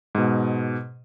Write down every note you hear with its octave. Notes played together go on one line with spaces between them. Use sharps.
G#2 B2